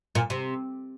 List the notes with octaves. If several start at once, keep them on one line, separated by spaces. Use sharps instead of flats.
A#2
C3